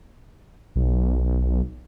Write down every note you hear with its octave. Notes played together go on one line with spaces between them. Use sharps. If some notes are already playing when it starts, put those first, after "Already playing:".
B1